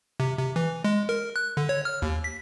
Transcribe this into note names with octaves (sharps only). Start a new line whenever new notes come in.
C3
C3
E3
G#3
A#4
F#6
D3
C#5
F6
D#2
B6